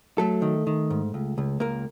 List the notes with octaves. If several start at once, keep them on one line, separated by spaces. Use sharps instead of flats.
F#3 A3 A4
D#3
D#3
G#2
C#2
C#2
C#2 A#3 A#4